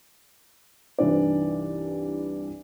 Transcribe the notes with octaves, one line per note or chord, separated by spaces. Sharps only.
C2 G2 E3 D4 D#4 D5